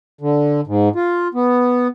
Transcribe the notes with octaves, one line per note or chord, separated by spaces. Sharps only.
D3
G#2
F4
B3